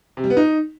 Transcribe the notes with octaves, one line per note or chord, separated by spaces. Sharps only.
C3
G3
B3
D#4